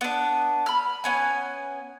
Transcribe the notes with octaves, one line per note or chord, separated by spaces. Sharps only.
B3 D4
B5 F6
B3 C#4 G#5